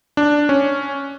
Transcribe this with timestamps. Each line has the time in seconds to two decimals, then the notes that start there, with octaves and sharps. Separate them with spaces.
0.17 D4
0.49 C#4